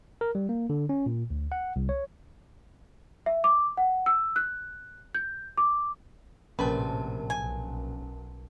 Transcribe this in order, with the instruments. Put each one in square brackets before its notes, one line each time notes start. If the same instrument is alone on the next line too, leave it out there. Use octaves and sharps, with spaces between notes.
[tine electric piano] A#4
G3
A#3
D3
C#4
A#2
D2
F#5
C2
C#5
[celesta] E5
D6
F#5
E6
F#6
G6
D6
[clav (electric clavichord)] A#1 [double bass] A2 C3 [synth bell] C#4 A#4 A5 [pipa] B4
[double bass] B1 [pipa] G#5